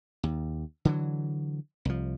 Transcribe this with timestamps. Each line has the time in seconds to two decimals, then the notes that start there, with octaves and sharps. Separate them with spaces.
0.23 D#2
0.85 D3 E3 F#3
1.85 C2 F3